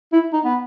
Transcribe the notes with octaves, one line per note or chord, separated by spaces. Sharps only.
E4
D#4
B3